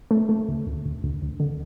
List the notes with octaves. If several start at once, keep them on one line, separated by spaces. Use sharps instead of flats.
A3
A3
D2
D2
D2
D2
D2
D3